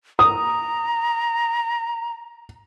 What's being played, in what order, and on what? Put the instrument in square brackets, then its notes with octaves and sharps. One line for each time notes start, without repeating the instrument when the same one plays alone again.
[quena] A#5 [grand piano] D#6